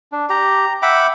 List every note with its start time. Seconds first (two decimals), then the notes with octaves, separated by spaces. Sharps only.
0.12 D4
0.30 G4 A#5
0.82 E5 F#5 G5 B5 D6